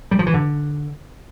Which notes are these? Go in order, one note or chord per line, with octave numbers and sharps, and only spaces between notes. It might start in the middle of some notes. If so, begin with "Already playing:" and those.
G3
F3
E3
D3